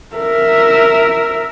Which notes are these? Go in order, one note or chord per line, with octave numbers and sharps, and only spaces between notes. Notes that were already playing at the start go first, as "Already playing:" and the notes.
A#4 E5